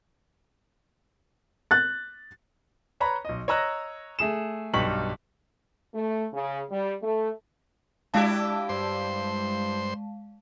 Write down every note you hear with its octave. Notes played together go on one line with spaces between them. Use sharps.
F#6 A6
B4 C#5 A#5 B5
B1 D#5
C#5 D#5 A#5 E6 F#6 A#6
A3 G#4 E7
B1 G2 G5 C#6 B6 F#7
A3
C#3
G3
A3
G#3 D4 E4 G4 F5 A5
G2 C5 C6